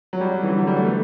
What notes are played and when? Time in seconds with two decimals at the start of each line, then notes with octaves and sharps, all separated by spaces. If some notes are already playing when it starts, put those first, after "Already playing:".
0.13 F#3
0.21 G3
0.28 F#3
0.43 E3
0.49 D3
0.58 F#3
0.67 G3
0.76 A3
0.85 B3